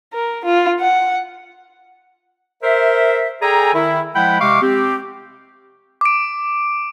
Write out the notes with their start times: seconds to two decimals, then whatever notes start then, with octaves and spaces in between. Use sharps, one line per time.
0.14 A#4
0.45 F4
0.80 F#5
2.63 A#4 C5 E5
3.42 G#4 A4 D5 G5 G#5 A#5
3.74 D#3 E4
4.15 F3 G#3 E4 F#5 G5 B5
4.40 C3 G#3 F5 C#6 D6
4.62 C4 G4
6.01 D6 D7